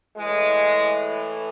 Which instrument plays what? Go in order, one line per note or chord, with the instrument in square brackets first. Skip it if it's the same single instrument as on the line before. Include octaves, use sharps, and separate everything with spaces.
[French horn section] A2 E3 G#3